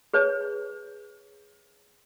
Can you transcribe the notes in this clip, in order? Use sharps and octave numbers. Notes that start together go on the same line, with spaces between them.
G#4 B4 C#5